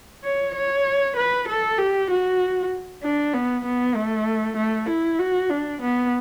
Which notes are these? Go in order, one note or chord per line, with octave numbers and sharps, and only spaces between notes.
C#5
C#5
B4
A4
G4
F#4
D4
B3
B3
A3
A3
E4
F#4
D4
B3